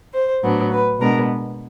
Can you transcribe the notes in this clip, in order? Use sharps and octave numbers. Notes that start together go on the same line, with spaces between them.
C5
A2 F#3 B3 D4
B4
B2 G#3 B3 D4 A#4